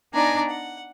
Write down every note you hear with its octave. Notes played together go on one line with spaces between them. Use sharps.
B3 D4 D#4 D5 G#5 A#5
F#5